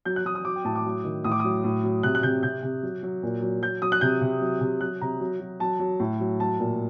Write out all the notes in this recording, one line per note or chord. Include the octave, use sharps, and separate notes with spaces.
F#3 G6
F#6
F#3 D#6
D#6
F#3 D6
G5
A2 A5
D6
F#3
D#3
A2 D#6
D6
F#3 D#6
A2
F#3
C3 F#6
F#6
C3 G6
C3 G6
C3
F#3
F#3
A#2
F#3
F#3 G6
F#3 D#6
F#6
C3 G6
C3
F#3
C3
F#3 F#6
C3 A#5
F#3
F#3
F#3 A5
F#3
A2
F#3
F#3 A5
A#2